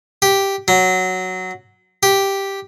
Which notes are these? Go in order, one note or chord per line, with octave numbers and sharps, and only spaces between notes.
G4
F#3
G4